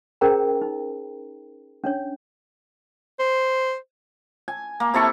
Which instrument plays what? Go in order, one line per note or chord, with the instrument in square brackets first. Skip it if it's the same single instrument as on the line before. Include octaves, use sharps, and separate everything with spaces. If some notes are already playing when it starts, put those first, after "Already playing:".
[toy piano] C#4 G#4 A#4 C5 G5 A#5
D#4
C#4 D4 C#5
[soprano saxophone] C5
[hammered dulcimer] G#5
A#3
C3 E4 A4 C#6